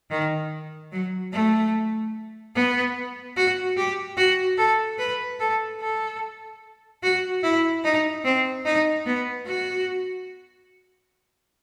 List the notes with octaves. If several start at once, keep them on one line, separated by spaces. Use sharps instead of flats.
D#3
F#3
A3
B3
F#4
G4
F#4
A4
B4
A4
A4
F#4
E4
D#4
C4
D#4
B3
F#4